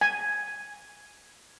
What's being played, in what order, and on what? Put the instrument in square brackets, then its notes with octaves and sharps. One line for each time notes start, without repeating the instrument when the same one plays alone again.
[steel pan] G#5